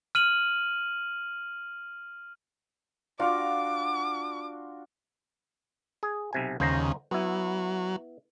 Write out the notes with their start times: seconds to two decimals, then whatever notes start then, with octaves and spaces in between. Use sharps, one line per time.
0.15 F6 D#7 F#7
3.20 D4 F4 F#4 F5 D6
6.03 G#4
6.33 B1 C3 G#5
6.60 G1 D#2 C#3 C5 A#5
7.11 F#3 B3 E4